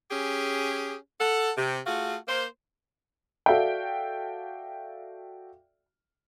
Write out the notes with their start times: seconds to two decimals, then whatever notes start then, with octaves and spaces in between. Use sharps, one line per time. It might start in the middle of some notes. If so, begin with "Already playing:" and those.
0.11 C#4 G4 G#4
1.20 A4 F#5
1.57 C3
1.87 A3 F4 F#4 G#4
2.28 A#3 C5
3.46 F#4 A4 D5 E5 F5 G5